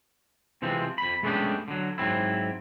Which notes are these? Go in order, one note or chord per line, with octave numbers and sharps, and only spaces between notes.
C3 E3 F3 G#3 C4
F2 B5
G#3 A3 B3 C#4 D4 G4
D3 F#3
G#2 F#3 C4 E4